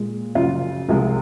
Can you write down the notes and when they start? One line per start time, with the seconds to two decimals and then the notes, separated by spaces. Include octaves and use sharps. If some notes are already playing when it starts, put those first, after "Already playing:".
Already playing: A#2 G#3
0.35 F#2 C#3 F3 F4
0.89 C2 C3 F3 G#3